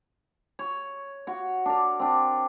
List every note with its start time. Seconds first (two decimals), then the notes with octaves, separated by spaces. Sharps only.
0.59 C#5
1.27 F#4 C#5
1.66 D4 A#4
2.00 C4 D4